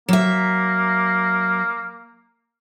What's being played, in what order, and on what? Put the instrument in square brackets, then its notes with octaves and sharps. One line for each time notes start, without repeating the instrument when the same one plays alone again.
[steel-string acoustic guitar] F#3 E5 [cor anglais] A#3